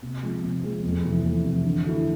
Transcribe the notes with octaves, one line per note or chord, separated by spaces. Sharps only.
C3
F3 G#3 C4
C3
F3 G#3 C4
F2
C3 E3 A3
F2
C3 E3 A3
D3
A3 E4